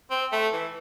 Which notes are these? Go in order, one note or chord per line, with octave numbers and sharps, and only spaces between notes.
C4
A3
E3